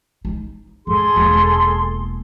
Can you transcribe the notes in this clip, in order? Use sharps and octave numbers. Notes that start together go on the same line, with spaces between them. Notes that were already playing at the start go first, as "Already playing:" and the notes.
D#4
F#2 G#4 A4 C6
E1 A#3